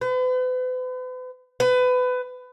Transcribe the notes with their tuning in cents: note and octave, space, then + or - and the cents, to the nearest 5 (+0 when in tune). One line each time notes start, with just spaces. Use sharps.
B4 +40
B4 +25